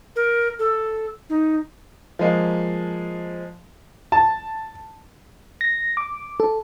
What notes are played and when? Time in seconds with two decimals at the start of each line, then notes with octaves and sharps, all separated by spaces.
0.16 A#4
0.59 A4
1.30 D#4
2.19 F3 G#3 A#3
4.12 A5
5.61 A#6
5.97 D6
6.40 A4